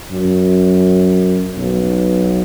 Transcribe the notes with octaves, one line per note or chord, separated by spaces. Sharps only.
F#2
B1